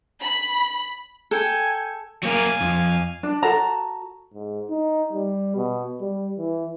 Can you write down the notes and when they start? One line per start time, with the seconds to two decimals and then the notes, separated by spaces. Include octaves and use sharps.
0.21 B5
1.31 A4 G5 G#5
2.23 F#3 A#3 A#4 F5 G#5
2.61 F2
3.23 D4
3.43 F#4 A4 A#5
4.34 G#2
4.70 D#4
5.13 G3
5.56 B2
6.01 G3
6.39 E3